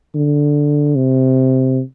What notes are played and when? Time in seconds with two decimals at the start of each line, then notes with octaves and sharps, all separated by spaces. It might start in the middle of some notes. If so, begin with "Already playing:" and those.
0.15 D3
0.96 C3